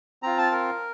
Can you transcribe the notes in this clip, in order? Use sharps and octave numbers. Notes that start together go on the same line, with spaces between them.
C4 F4 A#5
A5
A#4